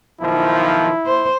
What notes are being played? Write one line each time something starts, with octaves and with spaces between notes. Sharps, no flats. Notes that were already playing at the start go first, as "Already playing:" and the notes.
B1 D#3 F3 E4
C5